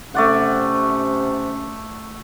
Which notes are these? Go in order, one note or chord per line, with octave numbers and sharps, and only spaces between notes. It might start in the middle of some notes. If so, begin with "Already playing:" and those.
C3 A3 C#4 D5 F#5